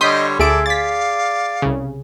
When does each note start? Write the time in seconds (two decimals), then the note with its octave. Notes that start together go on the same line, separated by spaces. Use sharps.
0.01 D3 G3 C#5 D#5 C6 D#6 G6 B6
0.39 D2 G#4 A4 E5 D6 D7
0.66 D5 F5 A6 B6
1.62 C2 C#3